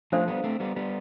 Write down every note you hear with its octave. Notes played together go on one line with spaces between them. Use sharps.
F3 A3 D4 A4 C5 F5
G3 B3
A3 C4
G3 B3
G3 B3